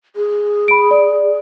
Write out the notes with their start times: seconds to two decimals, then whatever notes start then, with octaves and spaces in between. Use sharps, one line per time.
0.16 G#4
0.68 B5 D7
0.91 D5